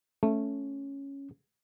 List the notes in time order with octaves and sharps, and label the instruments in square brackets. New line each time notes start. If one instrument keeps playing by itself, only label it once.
[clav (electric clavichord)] A3 [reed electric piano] C#4